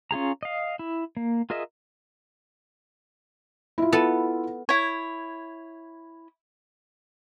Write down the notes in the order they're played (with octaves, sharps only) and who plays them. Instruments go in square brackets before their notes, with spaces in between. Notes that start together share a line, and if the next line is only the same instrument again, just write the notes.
[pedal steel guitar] C#4 F4 G#4 A#5
D#5 F5
E4
A#3
F4 G#4 A#4 D#5 E5
[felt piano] E4 F4
[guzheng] B3 A4 A5
[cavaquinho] E4 C#5